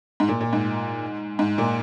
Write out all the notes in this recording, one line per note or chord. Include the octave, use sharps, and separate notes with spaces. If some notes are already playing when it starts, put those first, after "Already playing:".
G#2
A#2
A#2
G#2
G#2
A#2